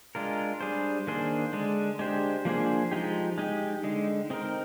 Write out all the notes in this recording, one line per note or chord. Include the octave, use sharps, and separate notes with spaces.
G#3 D4 F4 A#4
G3 D4 G#4 C5
D#3 A#3 D4 G#4 C5
D3 G#3 D4
G#3 D4 G4 C5
F3 A#3 D4 G#4 C5
F3 G#3 D#4 G4
G#3 D#4 G4
D3 G#3 D#4
C4 D#4 A#4